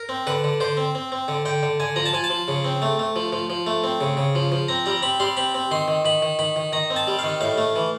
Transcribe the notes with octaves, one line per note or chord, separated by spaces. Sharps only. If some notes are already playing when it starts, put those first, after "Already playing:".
Already playing: A#4
C4
D3 B4
D3
D3 C5
C4
C4
C4
D3
D3 G5
D3
D3 G#5
F3 A#5
A5
F3 G#5
A5
F3
C#3
C4
A3
A3
F3
F3
F3
A3
C4
C#3
C#3
F3
F3
C4 A#5
G3 A#5
C4 B5
G3 C6
C4 B5
C4
D#3 C6
D#3
D#3 B5
D#3
D#3 B5
D#3
D#3 A#5
C4
A5
G3
D#3 F5
A2 F5
A3
E3